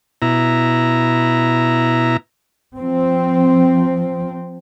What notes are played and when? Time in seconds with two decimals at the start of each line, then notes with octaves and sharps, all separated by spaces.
0.22 B2 E4 A#5
2.77 F3 C4